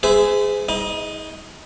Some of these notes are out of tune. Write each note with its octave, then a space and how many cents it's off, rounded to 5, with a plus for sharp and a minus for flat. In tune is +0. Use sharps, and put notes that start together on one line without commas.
G#4 +0 C5 -40 E5 +0
D#4 +45 D#5 +0